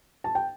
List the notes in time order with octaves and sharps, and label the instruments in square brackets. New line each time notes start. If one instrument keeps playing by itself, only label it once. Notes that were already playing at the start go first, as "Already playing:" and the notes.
[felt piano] A5
G5